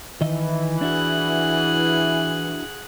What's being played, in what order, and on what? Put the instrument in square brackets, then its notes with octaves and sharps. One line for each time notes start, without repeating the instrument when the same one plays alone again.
[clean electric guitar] D#3 D#5 E5 [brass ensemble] E3
[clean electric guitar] D4 E4 F#4 [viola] G#4 F#5